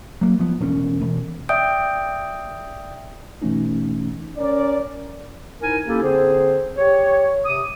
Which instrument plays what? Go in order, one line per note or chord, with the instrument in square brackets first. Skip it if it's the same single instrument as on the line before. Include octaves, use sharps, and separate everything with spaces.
[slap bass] F#3 A#3
F3 B3
E1 C#4
E1
[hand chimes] D5 E5 G5 D#6 G6 D7
[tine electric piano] F#2 B2 E3 A3 C#4 D#4
[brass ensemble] C#4 A#4 D5
[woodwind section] G#2 D#4 E4 A#4 G#5
A#3 C#4 E4 G4 A4
D3 C4 G#4 C5
G4 C#5
C3 D6 D#6